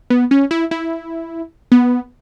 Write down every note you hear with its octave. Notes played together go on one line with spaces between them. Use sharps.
B3
C#4
E4
E4
B3